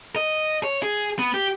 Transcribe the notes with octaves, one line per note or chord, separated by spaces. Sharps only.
D#5
C#5
G#4
B3
G4